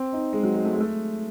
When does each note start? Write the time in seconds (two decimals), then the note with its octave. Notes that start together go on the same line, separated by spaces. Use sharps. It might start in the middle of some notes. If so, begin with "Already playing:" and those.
Already playing: C4
0.13 D#4
0.33 G#3
0.43 F#3
0.54 G#3
0.65 A3
0.73 G#3
0.80 A3